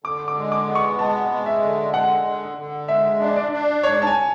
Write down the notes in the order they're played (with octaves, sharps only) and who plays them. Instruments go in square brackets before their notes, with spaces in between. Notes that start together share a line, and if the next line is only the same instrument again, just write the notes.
[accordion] D3 [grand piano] D6
[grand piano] D6
[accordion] G#3
[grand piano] D6
[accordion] B3
[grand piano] C#6
[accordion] G#3 [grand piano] A5
[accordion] G#3
[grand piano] E5
[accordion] D3
[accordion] G#3 [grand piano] F#5
[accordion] D3
D3
[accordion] G#3 [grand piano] E5
[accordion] D4
[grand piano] D5
[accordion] D4
[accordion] G#2 [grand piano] C#5
[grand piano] A5
G#5